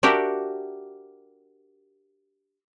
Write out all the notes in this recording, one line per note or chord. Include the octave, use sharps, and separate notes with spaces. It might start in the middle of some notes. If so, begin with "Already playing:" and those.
D4 F#4 G4 A#4 E5